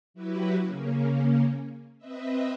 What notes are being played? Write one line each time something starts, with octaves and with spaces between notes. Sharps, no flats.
F#3 E4 F#4 G4 B4
C#3 A#3 C#4
C4 B4 D#5 E5